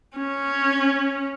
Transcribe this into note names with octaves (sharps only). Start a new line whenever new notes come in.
C#4